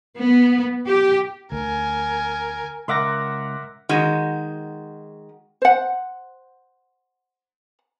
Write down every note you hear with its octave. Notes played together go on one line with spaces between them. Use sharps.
B3
G4
D2 A#4 G#5
C#2 A#4 E5 F#5 C6 D6 A#6
D#3 G#3 F#4
C5 F#5